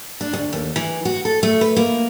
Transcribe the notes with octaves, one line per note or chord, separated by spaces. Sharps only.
D4
D2
D#2
E3
F#4
A4
A3
B4
A#3